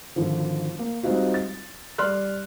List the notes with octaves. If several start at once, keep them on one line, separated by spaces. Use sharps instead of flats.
G#1 D3 F3
A#3
G3 G#3 C4 D#4 F4 F#4
A6
G3 D5 C6 F6 F#6